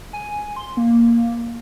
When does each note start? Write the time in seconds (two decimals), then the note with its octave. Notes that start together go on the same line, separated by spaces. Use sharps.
0.13 G#5
0.56 C6
0.77 A#3